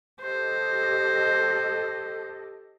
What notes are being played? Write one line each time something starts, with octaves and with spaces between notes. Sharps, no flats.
G4 A4 C5 D#5